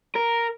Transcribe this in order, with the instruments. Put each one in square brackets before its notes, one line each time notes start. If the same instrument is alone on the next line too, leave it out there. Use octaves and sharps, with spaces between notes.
[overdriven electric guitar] A#4